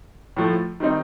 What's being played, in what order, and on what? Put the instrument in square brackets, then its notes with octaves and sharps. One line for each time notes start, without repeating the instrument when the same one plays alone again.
[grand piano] A2 F3 A3
D#3 G3 C4 D#4